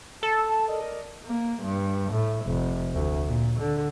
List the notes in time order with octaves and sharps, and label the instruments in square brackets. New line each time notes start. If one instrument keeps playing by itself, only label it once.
[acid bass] A4 [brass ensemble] A5
[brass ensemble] A#4 D5 D#5
[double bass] A#3
G2
A2
F1
D2
A#2
D3